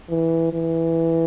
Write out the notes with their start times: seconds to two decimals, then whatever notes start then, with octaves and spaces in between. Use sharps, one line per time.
0.10 E3
0.53 E3